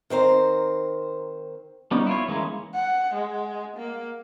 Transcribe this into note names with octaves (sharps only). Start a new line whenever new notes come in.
D#3 C4 C5 A#5
G3 B3 C#4 D#4
E4 F4 C#5
E3 G#3 A#3 C#4
F#5
G#3
A#3